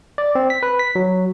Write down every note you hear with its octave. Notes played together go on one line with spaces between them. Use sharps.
D5
C4
B6
B4
B6
F#3